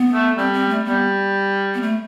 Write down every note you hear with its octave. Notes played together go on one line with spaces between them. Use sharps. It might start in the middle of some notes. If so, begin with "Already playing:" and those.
Already playing: B3
A3
G3 C4
C4
A3
G3 B3
B3
A3